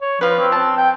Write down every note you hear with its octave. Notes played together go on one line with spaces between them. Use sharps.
C#5
F3 F4 B4
C4
A5
G5